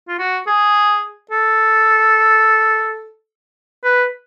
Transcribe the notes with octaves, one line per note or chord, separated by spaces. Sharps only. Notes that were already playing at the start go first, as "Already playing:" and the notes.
F4
F#4
G#4
A4
B4